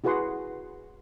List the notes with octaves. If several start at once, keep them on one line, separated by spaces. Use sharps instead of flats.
E4 F#4 G#4 B4 F#5 C6